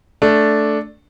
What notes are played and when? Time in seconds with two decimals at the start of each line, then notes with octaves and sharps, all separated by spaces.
0.22 A3 D4